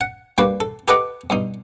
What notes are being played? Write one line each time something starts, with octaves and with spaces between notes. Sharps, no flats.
F#5
G3 A#3 D4 F#4 B4
A4
G4 A4 B4 D#5 F#5 D6
G2 B2 D#4